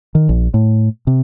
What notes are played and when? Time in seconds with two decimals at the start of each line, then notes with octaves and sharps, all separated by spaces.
0.15 D#3
0.29 A#1
0.54 A2
1.07 C3